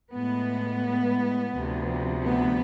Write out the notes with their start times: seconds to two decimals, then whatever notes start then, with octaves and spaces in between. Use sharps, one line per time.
0.14 A2 G#3 B3
1.54 D2 C3 F3
2.24 B3